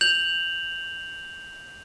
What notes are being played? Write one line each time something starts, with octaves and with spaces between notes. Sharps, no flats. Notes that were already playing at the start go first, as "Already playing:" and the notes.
G6 F7 F#7